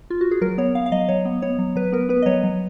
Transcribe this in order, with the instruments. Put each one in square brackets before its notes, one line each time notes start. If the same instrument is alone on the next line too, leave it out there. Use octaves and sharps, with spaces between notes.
[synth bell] F4
F#4
G#4
F#3 A#4
B3 C#5
B3 F5
F5
F#3 D#5
F#3 C#5
B3
B3 C#5
F#3
F#3 B4
B3 A#4
B3 B4
D#5
F#3 C#5
F#3